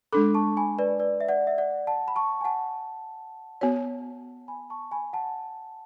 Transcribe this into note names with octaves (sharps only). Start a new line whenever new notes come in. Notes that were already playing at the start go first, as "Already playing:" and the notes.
G#3 D4 A4 B5 D6
A5 C#6
G#5 B5
B4 D5
B4 D5
E5
D5 F#5
E5
D5 F#5
F#5 A5
B5
A5 C#6
G#5
F#5 A5
B3 F#4 C#5
G#5 B5
A5 C#6
G#5 B5
F#5 A5